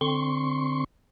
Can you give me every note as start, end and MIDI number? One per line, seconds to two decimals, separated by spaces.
0.01 0.84 50
0.01 0.84 60
0.01 0.84 84
0.01 0.84 85